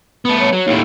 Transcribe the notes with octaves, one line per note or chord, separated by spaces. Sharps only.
A3 B3 B4
C#5
F#3
D#2 A2